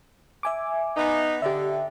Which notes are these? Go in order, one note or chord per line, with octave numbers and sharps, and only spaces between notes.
E5 G#5 D6
B3 D#4
D3 G4 E5